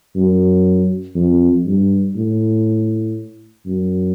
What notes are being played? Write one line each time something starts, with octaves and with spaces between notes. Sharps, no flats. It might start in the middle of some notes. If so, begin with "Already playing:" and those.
F#2
F2
G2
A2
F#2